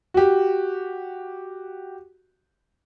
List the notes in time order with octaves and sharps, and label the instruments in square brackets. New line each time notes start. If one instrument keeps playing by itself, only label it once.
[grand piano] F#4 G4